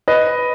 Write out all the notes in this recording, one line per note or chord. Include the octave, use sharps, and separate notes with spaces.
B4 D#5